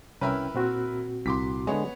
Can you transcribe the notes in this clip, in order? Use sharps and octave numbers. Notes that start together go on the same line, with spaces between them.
C2 C#4 E4 A#4 B4 G5
A#2 C4 F#4
C2 C6 D6 B6
D3 G#3 B3 C#5